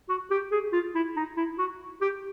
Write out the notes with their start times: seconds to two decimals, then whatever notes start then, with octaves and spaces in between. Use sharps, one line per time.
0.09 F#4
0.31 G4
0.52 G#4
0.72 F4
0.95 E4
1.16 D#4
1.37 E4
1.59 F#4
2.01 G4